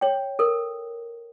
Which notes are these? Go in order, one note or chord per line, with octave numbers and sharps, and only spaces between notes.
C#5 G5
A4 A#4